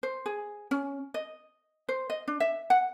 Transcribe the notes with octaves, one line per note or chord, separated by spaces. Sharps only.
C5
G#4
C#4
D#5
C5
D#5
D4
E5
F#5